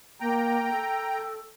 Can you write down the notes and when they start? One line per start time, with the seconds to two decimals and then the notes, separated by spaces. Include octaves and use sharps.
0.20 A#3 G5 A#5
0.71 A4